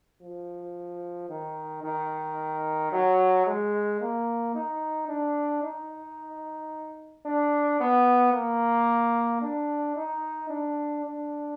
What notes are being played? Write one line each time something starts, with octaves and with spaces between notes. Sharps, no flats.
F3
D#3
D#3
F#3
G#3
A#3
D#4
D4
D#4
D4
B3
A#3
D4
D#4
D4
D4